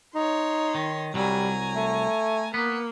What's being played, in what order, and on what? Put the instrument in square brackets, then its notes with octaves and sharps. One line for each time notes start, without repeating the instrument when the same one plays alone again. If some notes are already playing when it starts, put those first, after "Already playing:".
[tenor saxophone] D#4 [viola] C#5 C6
[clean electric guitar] D#3
[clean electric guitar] C2 F#3 [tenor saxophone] G3 [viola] G#5 A#5
[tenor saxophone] A3
[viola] A#3 [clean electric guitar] B3